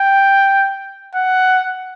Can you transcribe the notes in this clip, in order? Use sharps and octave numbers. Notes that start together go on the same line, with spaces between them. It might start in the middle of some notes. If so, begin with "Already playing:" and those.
Already playing: G5
F#5